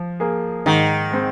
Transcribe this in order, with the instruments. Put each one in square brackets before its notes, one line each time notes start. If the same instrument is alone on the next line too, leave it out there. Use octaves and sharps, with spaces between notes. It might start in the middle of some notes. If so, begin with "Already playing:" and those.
Already playing: [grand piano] F3
A#3 G#4
[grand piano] G#2 [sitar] D#3
[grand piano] G#3 C4